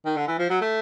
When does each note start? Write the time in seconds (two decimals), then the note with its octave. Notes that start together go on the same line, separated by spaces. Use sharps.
0.05 D#3
0.17 D3
0.28 E3
0.39 F3
0.50 F#3
0.61 A3